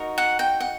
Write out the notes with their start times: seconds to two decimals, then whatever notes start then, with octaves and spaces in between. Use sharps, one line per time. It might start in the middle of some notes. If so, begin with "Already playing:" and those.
Already playing: D#4 F#4 A#4
0.18 F#5
0.39 G5
0.60 F#5